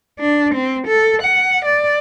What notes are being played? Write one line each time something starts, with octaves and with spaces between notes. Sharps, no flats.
D4
C4
A4
F#5
D5